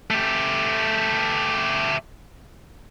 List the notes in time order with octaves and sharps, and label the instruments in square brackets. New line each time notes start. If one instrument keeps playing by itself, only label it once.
[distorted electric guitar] A3 G4